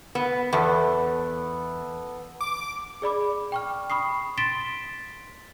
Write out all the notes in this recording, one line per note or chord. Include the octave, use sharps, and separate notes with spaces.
B3
E2 B3 A4 D5
D6
G#4 D5 B5 D6
G5 C#6 F6
B5 C#6 D#6 C7
C6 A6 B6 D7 E7 G7